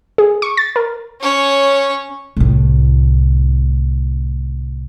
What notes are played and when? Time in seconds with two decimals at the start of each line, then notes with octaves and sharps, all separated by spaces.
0.18 G#4
0.42 C#6
0.57 A6
0.76 A#4
1.21 C#4 C#5
2.37 C2 A2